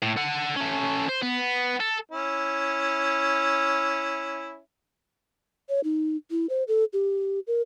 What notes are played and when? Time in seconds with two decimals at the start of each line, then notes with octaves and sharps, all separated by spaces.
0.02 A2
0.17 A4 F#5
0.57 A3 C#4
1.09 C5
1.23 B3
1.80 A4
2.11 C#4 E4
5.69 C#5
5.84 D#4
6.31 E4
6.49 C5
6.68 A4
6.93 G4
7.47 A#4